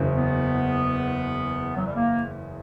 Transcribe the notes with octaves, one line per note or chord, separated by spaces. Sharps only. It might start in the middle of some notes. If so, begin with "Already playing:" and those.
Already playing: F#1 E2 C#3
B3
F#3
G3
A#3